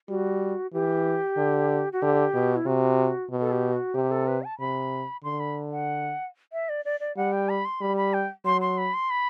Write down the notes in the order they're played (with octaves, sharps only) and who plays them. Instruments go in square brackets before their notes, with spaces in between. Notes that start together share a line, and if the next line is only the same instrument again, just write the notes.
[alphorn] G3 [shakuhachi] F#4
[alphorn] E3 [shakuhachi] G4
[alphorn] D3
[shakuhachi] F#4
[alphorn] D3 [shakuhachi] G4
[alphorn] B2
[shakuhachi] E4
[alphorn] C3 [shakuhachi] F#4
[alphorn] B2
[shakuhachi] A4
G4
F#4
[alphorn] C3 [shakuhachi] G4
[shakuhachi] A4
B4
A5
[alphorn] C3 [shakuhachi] B5
[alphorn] D3 [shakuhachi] C6
[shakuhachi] B5
F#5
E5
D5
D5
D5
[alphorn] G3 [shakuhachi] F#5
[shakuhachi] G5
B5
C6
[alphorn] G3 [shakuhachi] B5
[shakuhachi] B5
G5
[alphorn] F#3 [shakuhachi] C6
[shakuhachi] C6
B5
C6
B5